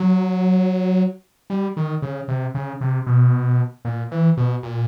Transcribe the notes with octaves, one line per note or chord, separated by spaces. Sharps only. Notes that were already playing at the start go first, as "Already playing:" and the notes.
Already playing: F#3
G3
D#3
C#3
C3
C#3
C3
B2
A#2
E3
B2
A#2